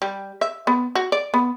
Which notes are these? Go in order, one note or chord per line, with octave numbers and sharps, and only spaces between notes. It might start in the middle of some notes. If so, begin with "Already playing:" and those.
G3
E5
B3
F#4
D5
B3